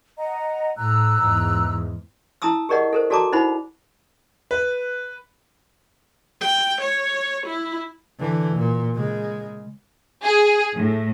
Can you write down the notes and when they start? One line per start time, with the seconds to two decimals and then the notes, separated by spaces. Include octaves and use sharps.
0.18 D#5 F#5 A#5
0.77 A2 A#5 E6 F#6
1.20 E2 G#2
2.42 E4 A5 A#5 D#6 E6
2.69 G4 G#4 A#4 D5 D#5 F#5
2.93 A4 A#4 C5
3.10 F#4 A4 D5 A5 A#5 D6
3.32 D#4 E4 C5 F#5 B5
4.51 B4
6.41 G5
6.81 C#5
7.47 E4
8.19 D3 E3
8.56 A#2
8.95 C#3 G#3
10.23 G#4
10.75 A2